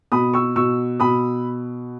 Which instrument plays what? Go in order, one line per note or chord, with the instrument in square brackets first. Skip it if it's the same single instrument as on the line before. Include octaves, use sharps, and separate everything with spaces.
[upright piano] B2 B5 D#6
C#6 E6
B2 C#6 E6
B2 B5 D#6